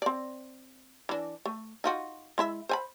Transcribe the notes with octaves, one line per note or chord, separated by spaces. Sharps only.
C4 D5
E3 D4
A3
D#4 F4 F#4
G#3 E4 E5
C5 G#5 B5